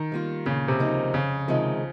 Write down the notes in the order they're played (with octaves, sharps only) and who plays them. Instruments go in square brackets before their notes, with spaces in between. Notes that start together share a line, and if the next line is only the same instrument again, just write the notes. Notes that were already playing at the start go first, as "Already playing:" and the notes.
Already playing: [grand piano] D#3
[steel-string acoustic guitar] G3 A#3 F4
[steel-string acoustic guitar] A#2 [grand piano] C#3
[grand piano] C3
[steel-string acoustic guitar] F3 A#3 D#4
[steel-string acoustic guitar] F2 [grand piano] C#3
[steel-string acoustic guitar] C3 D#3 G#3 [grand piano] F3